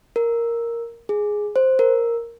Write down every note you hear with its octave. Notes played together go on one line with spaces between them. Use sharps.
A#4
G#4
C5
A#4